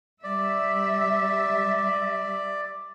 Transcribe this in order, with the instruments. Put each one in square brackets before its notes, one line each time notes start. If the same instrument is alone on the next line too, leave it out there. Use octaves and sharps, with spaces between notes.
[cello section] G3 E5 [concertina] D5